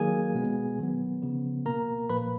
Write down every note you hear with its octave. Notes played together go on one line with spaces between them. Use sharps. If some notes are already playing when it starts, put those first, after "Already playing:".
Already playing: D#3 F#3 A#3 G#4 G#5
B2 G#3 B3
D#3 F#3 B3
C#3 F3 B3
B2 A#3 A#4 A#5
A#2 F3 A#3 B4 B5